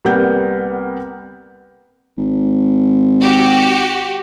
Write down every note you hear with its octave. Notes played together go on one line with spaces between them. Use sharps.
C2 G3 A#3 B3 F#5 G6
G#1
F#4 G4